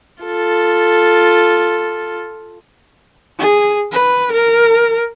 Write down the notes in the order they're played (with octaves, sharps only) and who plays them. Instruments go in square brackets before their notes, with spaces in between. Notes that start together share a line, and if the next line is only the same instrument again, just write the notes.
[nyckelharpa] F4 A4
[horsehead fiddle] G#4
B4
A#4